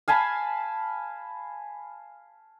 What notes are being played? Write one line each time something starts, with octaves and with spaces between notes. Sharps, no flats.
F5 G#5 A5 B5